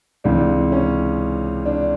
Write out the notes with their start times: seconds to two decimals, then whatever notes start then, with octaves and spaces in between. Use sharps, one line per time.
0.24 C#2 C3 E3 D4
0.72 C#4
1.66 D4